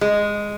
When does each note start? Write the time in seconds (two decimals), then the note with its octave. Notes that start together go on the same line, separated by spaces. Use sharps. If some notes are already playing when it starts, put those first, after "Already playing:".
0.01 G#3